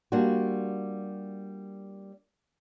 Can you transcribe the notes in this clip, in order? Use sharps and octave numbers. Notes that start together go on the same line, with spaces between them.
G3 A#3 D4 F4 F#4